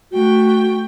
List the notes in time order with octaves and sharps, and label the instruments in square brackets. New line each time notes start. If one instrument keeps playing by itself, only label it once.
[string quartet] A3 G5 [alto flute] F#4